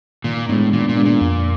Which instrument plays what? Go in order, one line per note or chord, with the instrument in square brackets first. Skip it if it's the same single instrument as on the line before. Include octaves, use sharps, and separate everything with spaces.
[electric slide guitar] A#2 [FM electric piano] D#3
[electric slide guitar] A2 [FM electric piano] G#3 B3 D4
[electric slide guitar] A#2 [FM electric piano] D#3
[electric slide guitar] A#2
[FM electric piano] G#3 B3 D4
[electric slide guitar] A#2
[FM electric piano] F2